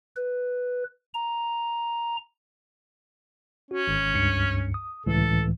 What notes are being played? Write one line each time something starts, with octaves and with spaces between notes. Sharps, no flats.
B4
A#5
C#4 F#4
G#1
C#2 G2 C#7
D#6
C#2 A2 E3 A4